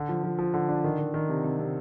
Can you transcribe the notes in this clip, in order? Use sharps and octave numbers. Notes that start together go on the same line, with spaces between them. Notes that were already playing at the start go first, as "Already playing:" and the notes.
Already playing: D3
F3
F3
F3
D3
D4
D#3
D#3
D#3
C3
C3
C3